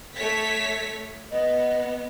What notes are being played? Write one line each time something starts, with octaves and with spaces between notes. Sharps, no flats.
A3 C#5 B6
B3 D#5